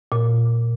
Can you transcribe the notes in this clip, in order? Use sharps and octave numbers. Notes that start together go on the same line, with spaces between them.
A#2